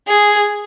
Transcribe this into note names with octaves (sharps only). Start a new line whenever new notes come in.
G#4